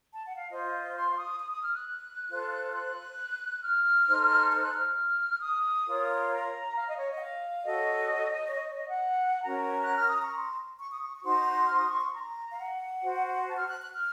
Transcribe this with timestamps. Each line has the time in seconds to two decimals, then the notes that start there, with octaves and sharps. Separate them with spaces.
0.11 A5
0.24 F#5
0.36 F5
0.50 F4 C5 D#5
0.94 C6
1.12 C#6
1.16 D#6
1.39 D#6
1.51 D#6
1.62 F6
1.73 F#6
2.29 F4 A4 C5
2.73 F#6
3.62 F6
4.08 D#4 A4 C5
4.52 F6
4.62 F#6
4.74 F6
5.42 D#6
5.86 F4 A#4 C#5
6.31 A#5
6.76 F5
6.87 D#5
6.98 C#5
7.10 D#5
7.17 F#5
7.20 F5
7.66 F#4 A4 C#5 D#5
8.47 C#5
8.55 D#5
8.66 C#5
8.77 D#5
8.88 F#5
9.44 C#4 F#4 A#4 A#5
9.83 F#6
9.95 F6
10.08 D#6
10.21 C#6
10.34 C6
10.79 C#6
10.90 D#6
11.02 C#6
11.15 C#6
11.23 D#4 F#4 C5 C6
11.65 F6
11.77 D#6
11.89 C#6
12.00 C6
12.13 A#5
12.52 F5
12.58 F#5
13.02 F#4 C5
13.48 A5
13.58 F6
13.69 F#6
13.81 F#6
13.92 F6